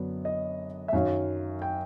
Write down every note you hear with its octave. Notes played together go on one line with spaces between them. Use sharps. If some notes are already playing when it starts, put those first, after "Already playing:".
Already playing: F#2 D3 F#3 B3 D4
D#5
E5
F#2 D#3 F#3 F5
G5